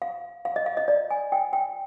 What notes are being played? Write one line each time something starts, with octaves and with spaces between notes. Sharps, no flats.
F5
F5
D#5
F5
D#5
D5
G#5
G5
G5